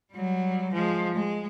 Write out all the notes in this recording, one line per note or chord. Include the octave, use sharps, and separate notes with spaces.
F#3 G3
F3 G#3
G#3